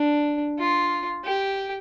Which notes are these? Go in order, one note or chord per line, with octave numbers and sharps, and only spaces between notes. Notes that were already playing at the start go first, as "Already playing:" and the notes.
Already playing: D4
F4
G4